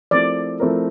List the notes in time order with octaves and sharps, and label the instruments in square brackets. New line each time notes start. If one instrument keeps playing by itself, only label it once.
[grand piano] F3 A3 C4 E4 A#4 [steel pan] D5
[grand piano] F3 A3 C4 E4 A#4